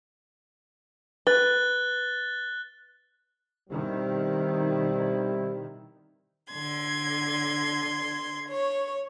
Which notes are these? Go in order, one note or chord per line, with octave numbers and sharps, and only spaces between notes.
B4 F#6 A6 G7
B2 D#3 G3 C4 E4
D3 C6 G#6
C#5